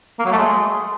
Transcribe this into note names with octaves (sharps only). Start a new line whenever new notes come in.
A#3
F#3
A3
G#3